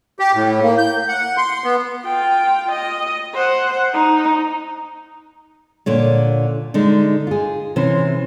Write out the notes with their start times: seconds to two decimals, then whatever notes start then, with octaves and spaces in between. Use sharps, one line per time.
0.19 G4
0.35 A2
0.63 A#3
0.78 G6
1.09 F#5
1.37 C6
1.64 B3
2.04 F4 G5
2.72 D#5
3.34 C5 F#5
3.94 D#4
5.86 A#2 D3 C#5
6.74 D3 G#3 D#4
7.27 F4 G#4
7.76 C3 E3 C#4 C5